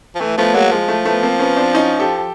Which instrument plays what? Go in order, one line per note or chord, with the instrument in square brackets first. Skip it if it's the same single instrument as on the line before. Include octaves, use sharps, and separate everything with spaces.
[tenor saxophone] F3
[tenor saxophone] E3 [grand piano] A3
[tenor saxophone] F3 [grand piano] A3 B3
[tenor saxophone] F#3 [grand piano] G#3 A#3
[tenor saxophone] F3 [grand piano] G#3
[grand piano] A3
A3 B3
A#3 C4
B3 C#4
C4 D4
C#4 D#4
G4 A4